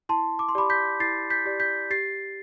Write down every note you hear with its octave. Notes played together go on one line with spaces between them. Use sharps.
E4 A5 C6
D6
C6
G4 D5 B5 D6
G6 B6
E4 A6 C7
G6 B6
G4 D5
G6 B6
G4 A6 C7